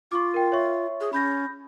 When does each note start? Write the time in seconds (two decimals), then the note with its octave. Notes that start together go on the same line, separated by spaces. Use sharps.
0.12 F4 C#6 D6
0.34 A#4 G5
0.52 C#5 E5 C#6
1.00 G#4
1.13 C#4 B5 G6 A#6